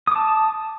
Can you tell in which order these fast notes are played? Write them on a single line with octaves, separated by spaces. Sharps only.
D#6 D6 A5